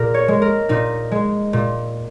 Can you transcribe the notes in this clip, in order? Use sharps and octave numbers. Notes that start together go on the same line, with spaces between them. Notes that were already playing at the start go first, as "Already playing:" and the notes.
Already playing: A#2 G#4 A#4
C#5
G#3
A#4
A#2 D#4
G#3
A#2